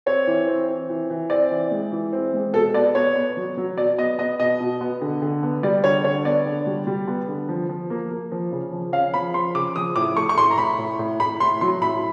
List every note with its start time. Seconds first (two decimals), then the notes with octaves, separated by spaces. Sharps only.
0.06 C4 C#5
0.27 E3
0.47 C4
0.68 C4
0.89 E3
1.10 E3
1.30 C4 D5
1.51 E3
1.71 G#3
1.92 E3
2.13 C4
2.33 G#3
2.54 B2 A4
2.74 B3 D5
2.95 B3 C#5
3.15 B3
3.37 F#3
3.57 F#3
3.77 B2 D5
3.98 B3 D#5
4.19 B3 D#5
4.39 B2 D#5
4.60 B2
4.81 B3
5.01 D3
5.22 D3
5.43 B3
5.63 G3 D5
5.84 D3 C#5
6.04 D3 C#5
6.25 B3 D5
6.46 D3
6.67 G3
6.87 G3
7.08 B3
7.28 D3
7.49 F3
7.69 F3
7.90 A#3
8.11 A#3
8.32 F3
8.52 C#3
8.73 F3
8.93 C#4 F5
9.14 F3 B5
9.34 F3 C6
9.55 C#3 D6
9.76 F3 D#6
9.96 A2 D6
10.17 A3 C#6
10.29 C#6
10.38 A2 C6
10.51 A#5
10.58 A2 B5
10.78 A2
10.99 A2
11.20 A2 B5
11.40 A2 C6
11.61 F#3 C6
11.81 A2 B5